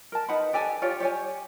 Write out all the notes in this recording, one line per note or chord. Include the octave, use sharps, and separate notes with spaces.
A#4 A5
D#4 B4 F#5 B5
D4 G4 A4 G#5
F4 G4 C#5 D5
G4 C#5 G#5